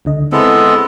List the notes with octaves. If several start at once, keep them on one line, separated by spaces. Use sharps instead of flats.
C#2 D3 D#5
G#3 B3 C4 E4 A4